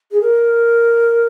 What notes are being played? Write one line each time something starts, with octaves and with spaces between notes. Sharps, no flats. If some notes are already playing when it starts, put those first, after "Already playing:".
G#4
A#4